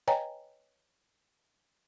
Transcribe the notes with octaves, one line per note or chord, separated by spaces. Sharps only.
B4 C#5 D#5 G5 G#5 A#5